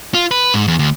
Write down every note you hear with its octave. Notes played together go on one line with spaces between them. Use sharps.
F4
B4
G#2
E2
D2